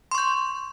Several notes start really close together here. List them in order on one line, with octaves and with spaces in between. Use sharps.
C6 C#6 G6